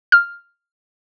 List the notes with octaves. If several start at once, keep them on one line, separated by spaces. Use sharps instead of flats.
F6